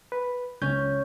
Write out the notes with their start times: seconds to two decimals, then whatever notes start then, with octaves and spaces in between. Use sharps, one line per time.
0.12 B4
0.62 C#2 C#4 G6